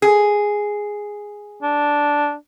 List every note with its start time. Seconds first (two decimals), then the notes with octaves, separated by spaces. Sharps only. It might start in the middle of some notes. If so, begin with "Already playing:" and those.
0.02 G#4
1.63 D4